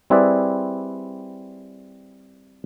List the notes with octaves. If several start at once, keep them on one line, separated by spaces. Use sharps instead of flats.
G3 C4 E4 G#4 B4 D5